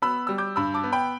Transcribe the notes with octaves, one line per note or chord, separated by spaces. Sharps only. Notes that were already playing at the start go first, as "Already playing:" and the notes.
B3 B5 E6
G3 E6
D6 G6
G2 B5 E6
A5 D6
B3
G5 B5